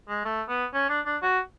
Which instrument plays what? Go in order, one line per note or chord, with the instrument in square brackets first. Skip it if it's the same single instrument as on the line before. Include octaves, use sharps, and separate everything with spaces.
[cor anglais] G#3
A3
B3
C#4
D4
D4
F#4